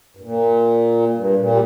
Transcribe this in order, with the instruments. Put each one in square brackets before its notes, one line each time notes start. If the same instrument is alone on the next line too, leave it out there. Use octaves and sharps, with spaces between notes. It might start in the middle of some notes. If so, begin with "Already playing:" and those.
[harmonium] G2
A#2
G2
A#2
G3